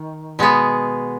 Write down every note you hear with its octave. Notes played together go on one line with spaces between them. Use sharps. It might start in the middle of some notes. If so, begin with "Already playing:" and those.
Already playing: D#3
B2 G#3 B3